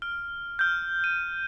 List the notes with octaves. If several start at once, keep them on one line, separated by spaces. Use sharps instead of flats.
F6
F6 G6
D#7